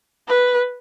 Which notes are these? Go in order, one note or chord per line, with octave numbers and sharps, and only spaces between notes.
B4